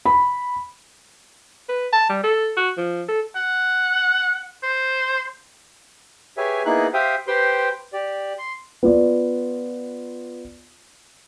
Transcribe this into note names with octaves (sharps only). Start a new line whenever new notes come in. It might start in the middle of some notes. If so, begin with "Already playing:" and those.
B5
B4
A5
G3
A4
F#4
F3
A4
F#5
C5
G4 G#4 B4 C#5 E5 G#5
A#3 B3 D#4 E4 G#4 F#6
G4 C5 E5 F5 G5 D#6
G4 B4 C5 G5 C6
G4 D5
C6
B3 F4 D5